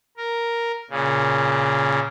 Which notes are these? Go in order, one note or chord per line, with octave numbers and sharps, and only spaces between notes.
A#4
A#2 C#3